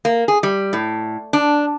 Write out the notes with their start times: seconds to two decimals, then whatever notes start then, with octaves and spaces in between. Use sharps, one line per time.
0.05 A#3
0.28 G#4
0.43 G3
0.73 A2
1.33 D4